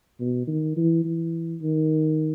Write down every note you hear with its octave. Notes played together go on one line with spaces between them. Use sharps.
B2
D#3
E3
E3
D#3